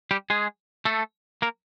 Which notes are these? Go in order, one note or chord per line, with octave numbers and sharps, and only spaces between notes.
G3 G4
G#3 G#4
A3 A4
A#3 A#4